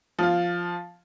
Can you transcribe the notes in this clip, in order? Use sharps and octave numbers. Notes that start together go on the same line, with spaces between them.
F3 F4